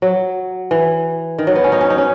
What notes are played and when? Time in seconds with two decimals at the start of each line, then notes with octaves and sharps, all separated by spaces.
0.02 F#3
0.71 E3
1.39 D#3
1.47 F#3
1.56 B3
1.64 C#4
1.72 D#4
1.81 C#4
1.90 D#4
1.98 C#4